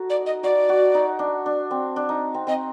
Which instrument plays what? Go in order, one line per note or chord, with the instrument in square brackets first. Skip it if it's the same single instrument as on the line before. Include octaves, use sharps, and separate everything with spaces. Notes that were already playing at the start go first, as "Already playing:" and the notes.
Already playing: [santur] D#4 F#4 A4
[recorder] D5
D#5
[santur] F#4 [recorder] D5
[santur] F#4
D#4
D4
D4
C4
D4
D#4
C4
[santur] C4 [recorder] D#5